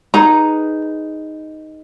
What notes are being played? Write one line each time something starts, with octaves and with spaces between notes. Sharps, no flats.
D#4 G#4 B4 A#5